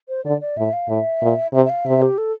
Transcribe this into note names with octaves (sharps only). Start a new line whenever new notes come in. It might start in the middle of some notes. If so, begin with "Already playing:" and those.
C5
D3 D5
D5
A2 E5
F5
A2 E5
A#2
C3 E5
E5
F5
C3 E5
G4
A4